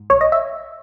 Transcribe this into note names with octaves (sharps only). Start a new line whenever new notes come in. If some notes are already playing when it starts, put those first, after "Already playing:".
Already playing: G#2
B1 C#5
D#5
E5